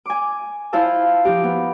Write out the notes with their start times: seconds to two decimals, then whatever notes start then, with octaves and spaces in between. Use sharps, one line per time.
0.06 G#5 D6
0.73 E4 F4 C5 F5 A5 E6
1.25 F3 D#4 G4
1.44 B3